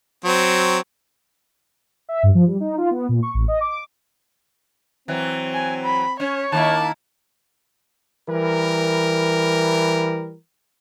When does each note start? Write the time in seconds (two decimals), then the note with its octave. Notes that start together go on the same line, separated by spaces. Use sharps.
0.24 F#3 C4
2.09 E5
2.23 G2
2.35 F3
2.47 G3
2.60 D#4
2.78 F4
2.91 B3
3.09 A#2
3.23 C#6
3.34 A1
3.48 D#5
3.60 D6
5.08 E3 F#3 C4
5.54 G#5
5.84 B5
6.20 C#4 C#5
6.52 D#3 A#3 E4 A5
8.28 E3 G3 A#4